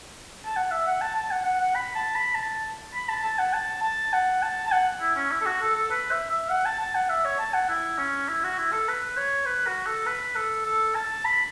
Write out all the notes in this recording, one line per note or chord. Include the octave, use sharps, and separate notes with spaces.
A5
F#5
E5
F#5
A5
A5
F#5
F#5
F#5
B5
A5
B5
A5
B5
A5
A5
F#5
A5
A5
F#5
A5
A5
F#5
E4
C#4
E4
A4
F#4
A4
A4
B4
E5
E5
F#5
A5
A5
F#5
E5
C#5
A5
F#5
E4
C#4
E4
F#4
E4
A4
B4
C#5
B4
F#4
A4
B4
A4
A4
A5
B5